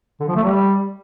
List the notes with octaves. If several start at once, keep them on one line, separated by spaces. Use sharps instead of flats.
D3
F3
A3
G3